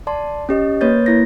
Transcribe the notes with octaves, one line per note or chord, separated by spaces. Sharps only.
D5 A5 C6
C#4 G4 D#5
A#3 B4 C#5 G6 A6
A#3 E4 A#6